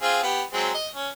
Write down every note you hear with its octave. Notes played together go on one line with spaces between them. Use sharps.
C4 F4 G#4
B3 G4
F#3 G#3 C4
D#5
C#4